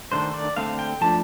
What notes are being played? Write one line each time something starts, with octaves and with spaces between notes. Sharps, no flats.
D#3 A3 D4 C5
D5
D3 A3 C4 F5
G5
F3 A3 D4 A5